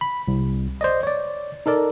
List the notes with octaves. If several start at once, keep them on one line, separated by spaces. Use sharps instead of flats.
B5
C2
C5 D5 D#5
C#5 D5
D#4 A4 A#4 D5